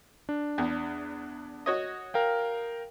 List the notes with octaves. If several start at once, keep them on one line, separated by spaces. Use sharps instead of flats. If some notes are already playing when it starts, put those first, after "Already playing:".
D4
E2
F#4 C#5 D#5
A#4 F5 G5